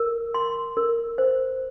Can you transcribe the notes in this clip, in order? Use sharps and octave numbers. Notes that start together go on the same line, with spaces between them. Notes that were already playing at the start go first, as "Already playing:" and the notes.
Already playing: A#4
C6
A#4
C5